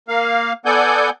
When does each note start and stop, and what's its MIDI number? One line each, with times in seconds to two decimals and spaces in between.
0.08 0.53 58
0.08 0.53 77
0.66 1.10 59
0.66 1.10 69
0.66 1.10 74
0.66 1.10 78
0.66 1.10 80
0.66 1.10 91